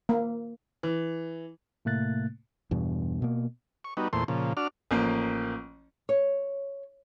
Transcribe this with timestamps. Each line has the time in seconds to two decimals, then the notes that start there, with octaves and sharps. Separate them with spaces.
0.09 A#3
0.83 E3
1.85 A2 C3 A3 A#3 F#6 A6
2.71 E2 G2 B2
3.22 B2 A#3
3.84 C#6
3.97 G3 B3 D#4 F#4
4.13 E2 A#2 A3 C5 C6
4.28 A#2 C#3 F3
4.57 D4 F#4 D5 F6
4.91 A1 F3 A#3
6.09 C#5